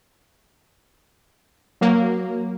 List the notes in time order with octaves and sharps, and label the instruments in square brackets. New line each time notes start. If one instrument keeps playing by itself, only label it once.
[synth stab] F#3 A#3